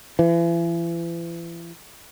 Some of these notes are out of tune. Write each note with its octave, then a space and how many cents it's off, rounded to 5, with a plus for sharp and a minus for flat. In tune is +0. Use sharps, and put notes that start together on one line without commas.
E3 +40